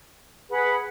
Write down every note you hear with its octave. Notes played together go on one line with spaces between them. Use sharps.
G#4 B4 F#5 B5